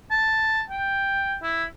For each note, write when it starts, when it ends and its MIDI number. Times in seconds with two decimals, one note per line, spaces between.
0.11 0.62 81
0.70 1.36 79
1.42 1.64 64